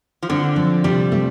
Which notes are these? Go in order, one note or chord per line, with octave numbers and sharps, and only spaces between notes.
F3
D3 C4
F3
C3 G3
A3